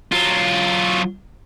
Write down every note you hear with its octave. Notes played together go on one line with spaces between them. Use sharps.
F#3 F4